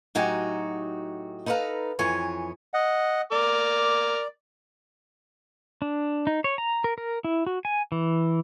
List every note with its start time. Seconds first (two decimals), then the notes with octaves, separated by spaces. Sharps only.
0.15 A2 F#3 D#4 F#4 G4 G#5
1.46 D#4 A4 B4 C5 F5 A#5
1.99 F2 E3 C#5 G#5
2.74 D#5 F#5
3.32 A#4 D5 D6
5.82 D4
6.27 D#4
6.44 C#5
6.58 A#5
6.84 A#4
6.98 A#4
7.24 E4
7.47 F#4
7.65 G#5
7.92 E3